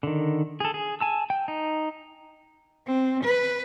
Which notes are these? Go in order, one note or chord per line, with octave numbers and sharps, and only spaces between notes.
D3 D#3
G#4 A4
G#4
G#5 A5 E6
G5
D#4
C4
B4